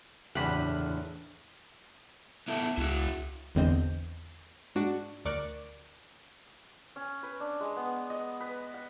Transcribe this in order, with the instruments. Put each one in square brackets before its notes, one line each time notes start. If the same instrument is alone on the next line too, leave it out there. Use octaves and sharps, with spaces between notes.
[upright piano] F#1 B5 [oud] E2 [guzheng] A2 D3 G4 [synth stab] F#6 B6
[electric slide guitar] B3 E4 A4
[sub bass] C#2 [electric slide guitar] E4 F#4
[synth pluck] G#1 E2 D3 C4 D#5 G6
G#2 D4 F#4
D2 A#4 D5 C#6 D6 F#6
[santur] C#4
B4
D4
G#3
B3
D#5
B4
F#5